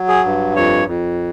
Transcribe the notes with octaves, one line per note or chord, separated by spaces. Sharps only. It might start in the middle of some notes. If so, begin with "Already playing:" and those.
Already playing: F#3
G#4
G2
F2 C#5
F2